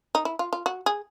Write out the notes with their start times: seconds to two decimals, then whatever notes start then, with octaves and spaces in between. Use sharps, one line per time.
0.15 D#4
0.25 E4
0.39 F4
0.53 F4
0.66 F#4
0.86 G#4